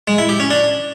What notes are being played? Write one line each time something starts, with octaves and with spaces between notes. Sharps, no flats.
G#3
E4
G4
C#4
D4